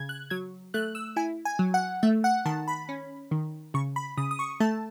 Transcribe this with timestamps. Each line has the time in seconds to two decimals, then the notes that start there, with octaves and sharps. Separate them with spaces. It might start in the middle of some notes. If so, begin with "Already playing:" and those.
Already playing: C#3 G#6
0.09 F#6
0.30 F#3 G#6
0.74 A3 F#6
0.95 E6
1.16 E4 G#5
1.45 G#5
1.59 F#3
1.74 F#5
2.03 A3 E5
2.24 F#5
2.45 D#3 A5
2.68 B5
2.89 C#4
3.31 D#3
3.74 C#3 C#6
3.96 B5
4.17 C#3 D#6
4.31 D#6
4.39 C#6
4.60 A3 A5